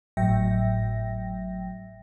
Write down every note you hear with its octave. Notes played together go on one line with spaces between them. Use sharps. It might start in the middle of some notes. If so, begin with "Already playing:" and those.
G#1 A2 F#3 E5 G5 A#6